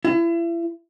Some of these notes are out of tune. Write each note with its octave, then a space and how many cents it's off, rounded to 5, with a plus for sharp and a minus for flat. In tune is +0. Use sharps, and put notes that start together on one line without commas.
E4 +35